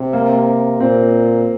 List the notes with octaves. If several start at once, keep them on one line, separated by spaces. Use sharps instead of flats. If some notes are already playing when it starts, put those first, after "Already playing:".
Already playing: C3
A#3
A#2 C4